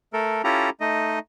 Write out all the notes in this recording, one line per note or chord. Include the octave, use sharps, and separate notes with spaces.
A3 A4 A#4
C#4 E4 F4 G4 A4 A#5
A3 D#4 D#5